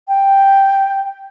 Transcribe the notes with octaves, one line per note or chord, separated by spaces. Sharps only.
G5